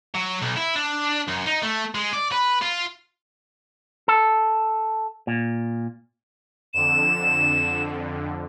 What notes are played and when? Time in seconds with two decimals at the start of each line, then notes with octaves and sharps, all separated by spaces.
0.14 F#3
0.42 B1
0.56 E4
0.76 D4
1.28 F#2
1.47 D#4
1.63 A3
1.95 G#3
2.13 D5
2.32 B4
2.62 F4
4.08 A4
5.27 A#2
6.74 F2 D3 E7